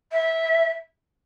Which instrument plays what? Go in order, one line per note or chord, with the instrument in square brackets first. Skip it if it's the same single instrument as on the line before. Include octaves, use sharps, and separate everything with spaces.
[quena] E5